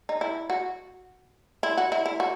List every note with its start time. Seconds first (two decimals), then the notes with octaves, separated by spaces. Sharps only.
0.09 D#4
0.21 E4
0.50 F#4
1.63 E4
1.77 F#4
1.92 E4
2.06 E4
2.20 F#4